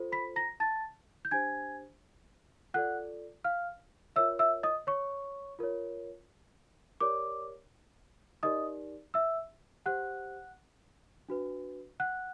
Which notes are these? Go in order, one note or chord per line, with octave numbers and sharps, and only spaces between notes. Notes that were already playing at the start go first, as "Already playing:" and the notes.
Already playing: F4 A4 C5
B5 B6
A#5 A#6
A5 A6
G6
D4 G4 C5 G#5 G#6
F4 A4 D5 F#5 F#6
F5 F6
F4 A#4 C#5 E5 E6
E5 E6
D#5 D#6
C#5 C#6
F4 A#4 C#5
G4 A#4 C#5 D5 D6
D#4 G4 A#4 D5 D#5 D#6
E5 E6
G4 C5 F#5 F#6
D4 F#4 B4
F#5 F#6